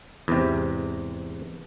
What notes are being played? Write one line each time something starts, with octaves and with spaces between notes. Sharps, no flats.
E2 G#2 C3